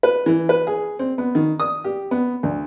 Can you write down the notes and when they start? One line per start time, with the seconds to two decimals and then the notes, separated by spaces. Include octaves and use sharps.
0.03 B4
0.26 E3
0.49 B4
0.67 G#4
0.99 C4
1.18 B3
1.35 D#3
1.60 D#6
1.84 G4
2.11 B3
2.43 D2